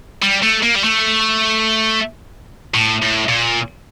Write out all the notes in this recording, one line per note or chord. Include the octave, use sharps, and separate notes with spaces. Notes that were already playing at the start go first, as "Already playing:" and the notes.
G3
A3
A#3
G3
A3
A2
A2
A#2